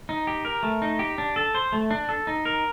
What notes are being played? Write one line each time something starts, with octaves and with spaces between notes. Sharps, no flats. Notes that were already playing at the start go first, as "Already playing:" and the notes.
D#4
G4
A#4
A3
D#4
G4
D4
A4
C5
A3
D4
A4
D#4
A#4